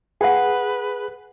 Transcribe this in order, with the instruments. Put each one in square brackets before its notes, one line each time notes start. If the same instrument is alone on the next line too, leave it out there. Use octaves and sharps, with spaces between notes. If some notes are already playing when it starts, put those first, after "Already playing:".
[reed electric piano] G#4 [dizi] B4 [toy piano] F#5 G5